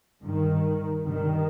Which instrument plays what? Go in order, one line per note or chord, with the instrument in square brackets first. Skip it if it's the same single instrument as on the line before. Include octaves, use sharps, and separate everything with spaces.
[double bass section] G2 D#3
G2 D#3